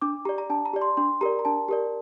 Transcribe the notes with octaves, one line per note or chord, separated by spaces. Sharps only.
D4 D6
G4 D5 A#5
A#5
D4 A5
A#5
G4 D5
C6
D4 C6
G4 A#4 D5 A#5
A#5
D4 A5
G4 A#4 D5